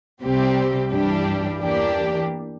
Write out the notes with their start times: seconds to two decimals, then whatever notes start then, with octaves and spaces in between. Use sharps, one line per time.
0.22 C2 C3 G3 C4 G4
0.91 G2 E3 G3 D4 G4
1.61 E2 E3 A#3 D4 G4